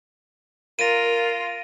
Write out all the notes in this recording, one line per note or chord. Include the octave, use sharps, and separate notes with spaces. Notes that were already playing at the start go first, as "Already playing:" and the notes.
F4 A#4 A#6 D7 D#7